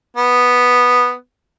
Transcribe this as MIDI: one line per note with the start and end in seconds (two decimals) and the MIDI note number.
0.17 1.13 59